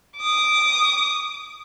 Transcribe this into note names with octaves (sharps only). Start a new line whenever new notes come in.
D6 D#6